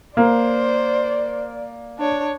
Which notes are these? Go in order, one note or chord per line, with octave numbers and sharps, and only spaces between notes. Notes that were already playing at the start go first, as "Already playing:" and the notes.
A#3 C5 D5
D4 C#5